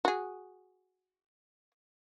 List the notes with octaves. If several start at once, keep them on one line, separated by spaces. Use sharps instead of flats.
F#4 G#4